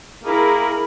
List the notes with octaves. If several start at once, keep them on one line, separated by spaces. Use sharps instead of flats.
A#3 E4 G#4 A#4 B5